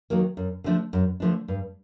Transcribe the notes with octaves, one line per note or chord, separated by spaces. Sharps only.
D#3 F#3 A#3
F#2
D3 F3 A3 D4
F#2
D3 F3 A3 D4
G2